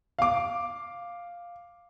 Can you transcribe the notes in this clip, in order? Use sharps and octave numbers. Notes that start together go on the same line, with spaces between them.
F5 D6